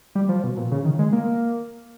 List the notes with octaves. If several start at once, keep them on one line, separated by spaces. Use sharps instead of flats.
G3
F3
B2
A#2
C#3
D#3
G#3
A#3